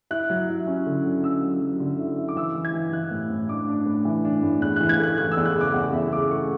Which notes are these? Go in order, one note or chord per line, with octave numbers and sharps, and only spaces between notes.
E4 F#6
F#3
E4
C#4
D3
F#3
C#4 E6
F#3
F#3
D3
E4
E4
D6
E3 E6
E3
G#6
E3
E3 F#6
A2
A2
D4 D6
D4
A2
E3
D4
A2
E2 F#6
E3 F#6
G#6
A3 F#6
E3 F#6
E6
E2
F#6
C#3
D6
E2 F#5
E2 E5
C#3 D6
A3 C#6